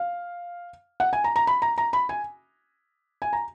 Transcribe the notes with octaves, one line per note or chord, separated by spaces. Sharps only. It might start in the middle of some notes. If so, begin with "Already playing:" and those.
Already playing: F5
F#5
G#5
A#5
A#5
B5
A#5
A#5
B5
G#5
G#5
A#5